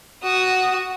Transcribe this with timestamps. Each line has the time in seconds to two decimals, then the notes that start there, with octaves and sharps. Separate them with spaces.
0.23 F#4 D#6